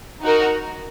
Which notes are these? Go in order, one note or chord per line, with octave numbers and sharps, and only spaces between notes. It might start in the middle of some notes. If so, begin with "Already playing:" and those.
D#4 F#4 A#4